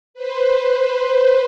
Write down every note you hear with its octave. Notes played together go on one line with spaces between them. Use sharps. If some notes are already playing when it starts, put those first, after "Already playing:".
B4 C5